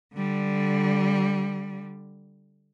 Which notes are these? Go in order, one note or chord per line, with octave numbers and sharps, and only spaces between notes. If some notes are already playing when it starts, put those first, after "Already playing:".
D3 G3